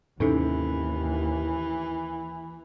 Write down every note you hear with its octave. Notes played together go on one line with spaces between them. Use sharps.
D#2 G#2 C3 E3 C#4 D#4 A4